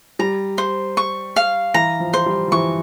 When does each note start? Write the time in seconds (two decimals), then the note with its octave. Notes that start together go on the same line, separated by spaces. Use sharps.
0.19 G3 A#5
0.58 C5
0.97 C#6
1.36 F5
1.74 E3 A#5
2.00 F3
2.14 C5
2.26 G3
2.48 F3
2.52 E3 C#6